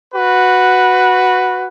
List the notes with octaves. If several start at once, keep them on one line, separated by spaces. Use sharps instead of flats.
F#4 B4